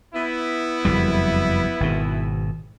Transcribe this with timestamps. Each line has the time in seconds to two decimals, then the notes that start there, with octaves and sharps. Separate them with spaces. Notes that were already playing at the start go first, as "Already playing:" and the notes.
0.14 B3 E4
0.85 F#1 F2 G3
1.80 G#1 B2